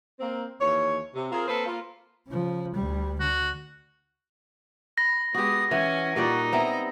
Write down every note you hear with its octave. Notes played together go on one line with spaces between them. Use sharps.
A#3 C4
D#2 E3 C#5
C3
C4 F4 G#4 A#4
A#3 C4 A4 B4 C5
A#3 F4
C#3 F3
D2 G3
D3 F#4
B5 A#6
G#3 B3 F#4 G4 D#6
E3 C#4 F#5 G#5
A#2 G3 D#4 F#4 D5
B3 C4 E4 A#5